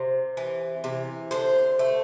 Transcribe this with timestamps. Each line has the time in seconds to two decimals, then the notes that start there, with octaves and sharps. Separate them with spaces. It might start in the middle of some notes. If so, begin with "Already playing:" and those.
Already playing: C3 C5
0.37 E3
0.84 C3
1.31 D3 C5
1.79 A3